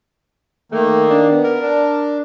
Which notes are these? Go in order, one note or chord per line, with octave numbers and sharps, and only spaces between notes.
D#3 A3 A#3
D4
B3
A#4
D4